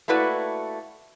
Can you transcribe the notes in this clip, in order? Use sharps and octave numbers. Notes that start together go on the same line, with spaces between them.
A3 A#3 E4 F#4 B4 D5